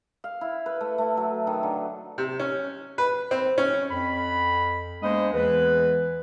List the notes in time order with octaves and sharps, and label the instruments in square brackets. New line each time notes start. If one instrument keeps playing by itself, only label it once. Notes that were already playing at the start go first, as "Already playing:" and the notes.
[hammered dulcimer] F5
E4
B4
A3
A3
F#3
D#3
D3
[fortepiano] C3
C#4
B4
C4
C#4
[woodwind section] F2 B5
G#3 A#3 B3 D4 C5 D#5
E2 E3 G#3 B4